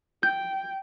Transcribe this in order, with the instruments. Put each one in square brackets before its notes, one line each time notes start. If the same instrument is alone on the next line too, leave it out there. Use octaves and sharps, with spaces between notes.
[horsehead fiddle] G5 [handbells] G6